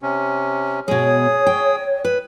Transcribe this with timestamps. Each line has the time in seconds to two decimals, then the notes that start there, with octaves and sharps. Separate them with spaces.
0.02 C3 C#4
0.88 B2 G#3 G#4 C#5 D#6
1.47 G5
2.05 B4